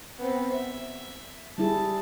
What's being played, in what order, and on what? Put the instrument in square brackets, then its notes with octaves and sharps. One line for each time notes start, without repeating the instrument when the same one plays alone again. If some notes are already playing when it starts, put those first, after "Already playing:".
[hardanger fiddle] B3 C4
E5
[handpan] G3 E4 G#4 [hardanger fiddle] A5